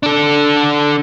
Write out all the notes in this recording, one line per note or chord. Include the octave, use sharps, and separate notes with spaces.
D4 A4